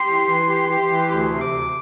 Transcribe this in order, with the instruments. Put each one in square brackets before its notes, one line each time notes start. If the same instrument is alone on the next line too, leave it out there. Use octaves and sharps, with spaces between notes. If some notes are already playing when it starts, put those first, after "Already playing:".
Already playing: [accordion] G4 [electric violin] C6
[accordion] E3
E3
G4
G4
E3
[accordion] D2 [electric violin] C6
[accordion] C3
[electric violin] D6
[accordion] D2